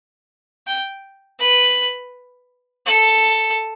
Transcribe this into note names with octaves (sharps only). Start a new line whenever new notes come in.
G5
B4
A4